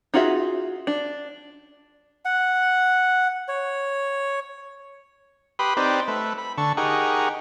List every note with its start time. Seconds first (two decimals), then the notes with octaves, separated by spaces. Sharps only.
0.14 D#4 F4 F#4 G#4 E5
0.87 D4
2.25 F#5
3.48 C#5
5.59 G4 B4 B5 C6 D#6
5.77 C4 D#4 G4 B4 C5 D5
6.08 A3 B4 E5
6.38 B5
6.58 D3 A5 C#6
6.77 D#4 G4 G#4 A#4 F#5 C#6